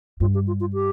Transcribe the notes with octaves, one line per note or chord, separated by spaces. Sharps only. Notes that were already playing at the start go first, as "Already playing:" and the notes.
G2 F4
G4
F4
F4
G4